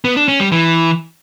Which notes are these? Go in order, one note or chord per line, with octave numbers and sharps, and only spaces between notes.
B3
D4
C#4
G3
E3